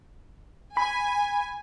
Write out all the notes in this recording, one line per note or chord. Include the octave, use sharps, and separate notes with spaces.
G#5 B5